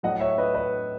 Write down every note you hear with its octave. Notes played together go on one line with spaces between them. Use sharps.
A2 F#3 A3 D#5 F#5
C#5 E5
B4 D#5
B4 D#5